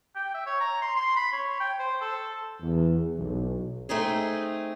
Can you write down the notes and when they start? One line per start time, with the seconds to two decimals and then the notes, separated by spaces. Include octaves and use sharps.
0.15 G5
0.34 E5
0.46 C#5
0.60 A#5
0.82 C6
0.96 C6
1.16 B5
1.32 C#5
1.60 G5
1.79 C5
2.01 A4
2.60 E2
3.17 B1
3.89 A3 C4 D#4 G#4